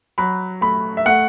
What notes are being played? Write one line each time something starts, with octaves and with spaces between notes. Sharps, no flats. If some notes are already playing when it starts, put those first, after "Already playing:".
F#3 B5
A3 B5
E5
A3 F#5